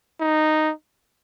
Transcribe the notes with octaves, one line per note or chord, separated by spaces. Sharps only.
D#4